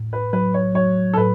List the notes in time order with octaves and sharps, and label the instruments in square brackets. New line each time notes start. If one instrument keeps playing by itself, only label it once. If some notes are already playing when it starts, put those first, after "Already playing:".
Already playing: [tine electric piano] A2
[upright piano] B4
[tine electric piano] F#3 [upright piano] B4
[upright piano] C#5
[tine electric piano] F#3 [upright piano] C#5
[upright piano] A4
[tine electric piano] A2 [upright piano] B4